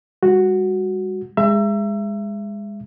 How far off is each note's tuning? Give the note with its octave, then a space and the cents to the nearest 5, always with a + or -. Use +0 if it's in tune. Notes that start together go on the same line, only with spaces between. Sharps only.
G3 +45 F#4 +0
G#3 -20 E5 +25 A#5 +0